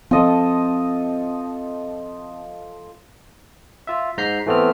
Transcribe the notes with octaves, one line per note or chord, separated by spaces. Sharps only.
F3 C4 A4 D#5
F4 E5
G#2 A#5 G6 B6 C7
E3 A3 B3 C4 F6